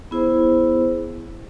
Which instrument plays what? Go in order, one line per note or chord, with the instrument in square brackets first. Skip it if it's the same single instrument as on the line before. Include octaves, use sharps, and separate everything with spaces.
[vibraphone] B3 E4 G#4 C5